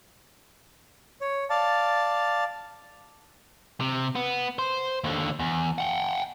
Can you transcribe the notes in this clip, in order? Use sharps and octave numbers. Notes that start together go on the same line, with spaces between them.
C#5
D5 F5 A5
C3
B3
C5
D#2 D3
E2
F#5 G5